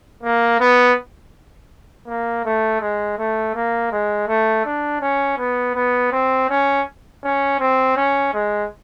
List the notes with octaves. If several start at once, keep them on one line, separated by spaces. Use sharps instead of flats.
A#3
B3
A#3
A3
G#3
A3
A#3
G#3
A3
D4
C#4
B3
B3
C4
C#4
C#4
C4
C#4
G#3